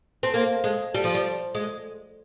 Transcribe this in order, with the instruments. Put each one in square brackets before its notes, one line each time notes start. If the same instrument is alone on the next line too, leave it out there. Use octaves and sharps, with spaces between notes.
[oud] C4
A#3
G#3
G3
F3
G3
G#3